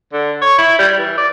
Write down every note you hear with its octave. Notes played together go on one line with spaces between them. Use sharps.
D3
C#5
E4
G3
E3
D5